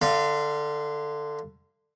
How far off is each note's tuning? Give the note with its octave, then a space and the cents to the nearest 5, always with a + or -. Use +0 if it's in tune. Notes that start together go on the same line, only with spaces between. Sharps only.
D3 +15 F5 -30